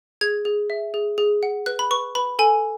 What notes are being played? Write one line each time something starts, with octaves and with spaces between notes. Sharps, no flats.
G#4 G#6
G#4
E5
G#4
G#4
F#5
B4 F#6
B5
B4 C#6
B4 B5
A4 G#5